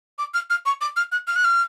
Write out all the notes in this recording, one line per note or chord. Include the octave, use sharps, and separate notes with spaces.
D6
F6
F6
C#6
D6
F6
F#6
F6
F#6
F6